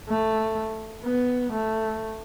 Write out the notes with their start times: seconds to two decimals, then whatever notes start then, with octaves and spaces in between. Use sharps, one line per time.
0.09 A3
1.05 B3
1.52 A3